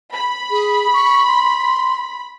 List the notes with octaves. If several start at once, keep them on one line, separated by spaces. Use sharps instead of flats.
B5
G#4
C#6
C6